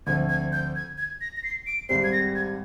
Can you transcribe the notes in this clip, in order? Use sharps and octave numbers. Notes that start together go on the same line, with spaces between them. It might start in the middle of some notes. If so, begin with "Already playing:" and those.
D2 D3 F3 C4 G#6
G#6
G6
G#6
G#6
A#6
A#6
C7
D7
G#1 G#2 G3 C4 C7
G#6
A#6
G#6